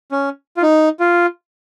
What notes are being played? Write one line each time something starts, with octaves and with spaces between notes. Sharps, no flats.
C#4
F4
D#4
F4